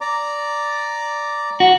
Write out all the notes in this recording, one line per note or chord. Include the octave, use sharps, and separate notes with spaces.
D5 A#5 D6
F#4